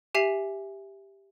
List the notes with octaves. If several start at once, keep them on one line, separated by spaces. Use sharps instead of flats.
G4 E5 G#5 B6 C7 F7